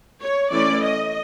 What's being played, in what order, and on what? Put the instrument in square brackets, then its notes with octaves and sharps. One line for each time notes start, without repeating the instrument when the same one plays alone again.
[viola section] C#5
E3 A3 C#4 D5
D#5